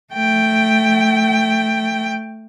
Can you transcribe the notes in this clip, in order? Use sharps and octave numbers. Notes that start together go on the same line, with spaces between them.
A3 G5